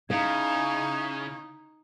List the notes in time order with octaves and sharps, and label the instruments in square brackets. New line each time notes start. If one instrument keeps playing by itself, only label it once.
[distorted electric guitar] C#3 [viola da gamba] D#4 [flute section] E4 C#6 G#6 [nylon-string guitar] F5